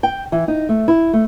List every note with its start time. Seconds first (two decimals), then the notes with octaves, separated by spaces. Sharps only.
0.03 G5
0.32 E3
0.48 D#4
0.69 A3
0.88 E4
1.13 A3